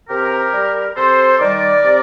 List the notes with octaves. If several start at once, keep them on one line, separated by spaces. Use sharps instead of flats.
C3 G4 A#4
G3
C3 A4 C5
D#3 G3 A#4 D5
C3